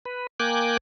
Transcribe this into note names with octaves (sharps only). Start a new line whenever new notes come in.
B4
A#3 G5 G#5 D6 F#6